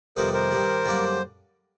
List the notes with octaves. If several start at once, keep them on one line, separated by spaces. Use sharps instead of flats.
F2 C3 D#3 G3 B3 A#4 C5
A#4 C5
G2 D#3 G3
F#2 D3 G3 A#3 D4